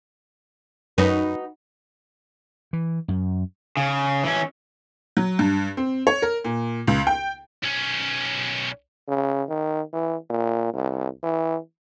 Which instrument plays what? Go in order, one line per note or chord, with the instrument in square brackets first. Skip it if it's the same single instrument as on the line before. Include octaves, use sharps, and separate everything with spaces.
[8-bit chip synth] F#2 [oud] D#4 F#4 B4
[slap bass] E3
F#2
[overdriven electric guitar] C#3
E3 C#4
[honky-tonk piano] F#3
G2
C4
C#5
A#4
A#2
C#2
G5
[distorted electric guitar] B1 C#4
[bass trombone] C#3
D#3
E3
A#2
C2
E3